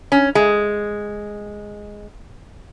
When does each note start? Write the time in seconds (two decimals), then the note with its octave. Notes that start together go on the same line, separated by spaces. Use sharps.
0.12 C#4
0.35 G#3